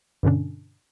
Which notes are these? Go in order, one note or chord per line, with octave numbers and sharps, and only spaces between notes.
G2 B2 D3 C#4 D4